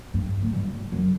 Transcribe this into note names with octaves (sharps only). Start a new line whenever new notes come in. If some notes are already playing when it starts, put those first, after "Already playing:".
G2
A2
G2
F#2